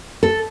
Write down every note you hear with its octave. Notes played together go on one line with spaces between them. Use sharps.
A4